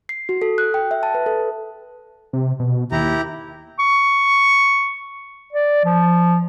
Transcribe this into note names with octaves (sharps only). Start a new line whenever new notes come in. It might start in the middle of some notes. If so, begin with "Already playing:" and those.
C7
F#4
A4
F#6
G5
E5
A5
B4
A4
C3
B2
D#2 E4 G4 A#5
C#6
D5
F3